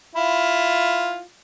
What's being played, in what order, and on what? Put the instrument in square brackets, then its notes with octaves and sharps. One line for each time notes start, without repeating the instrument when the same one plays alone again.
[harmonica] E4 F4